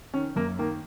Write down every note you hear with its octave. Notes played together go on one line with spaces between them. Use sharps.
D#3 C#4
F#2 A#3
D#3 A#3